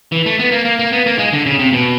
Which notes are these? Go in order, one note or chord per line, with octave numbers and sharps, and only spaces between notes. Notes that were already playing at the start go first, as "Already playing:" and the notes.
E3
A3
B3
A#3
A#3
A#3
B3
A#3
G#3
D3
C#3
C3
B2